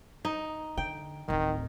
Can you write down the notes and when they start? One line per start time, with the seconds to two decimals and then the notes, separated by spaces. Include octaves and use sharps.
0.25 D#4
0.77 D3 G5
1.28 D1 A1 D#3